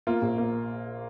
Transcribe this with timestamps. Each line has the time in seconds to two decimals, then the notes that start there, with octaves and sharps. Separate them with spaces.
0.07 A#3 F4
0.22 A#1
0.38 A#3